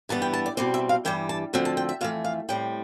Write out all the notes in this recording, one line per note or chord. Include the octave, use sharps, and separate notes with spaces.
G2 E3 G3 B3 A5
G5
A5
D5
B2 G3 C4 D5
E5
F5
G2 E3 G3 G5
A5
D2 D3 F3 C4 G5
A5
G5
E5
F2 E3 A3 F5
F5
A2 G3 C4 G5